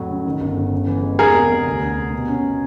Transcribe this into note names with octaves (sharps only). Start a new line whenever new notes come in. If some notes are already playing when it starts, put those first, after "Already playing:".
Already playing: F2 A2 F#3
C#3
D#3
G1
G1
C#3
E3
G#3
E2 G#4 A#4
C3
C3
D2
D2
C3
B2
C#4
B2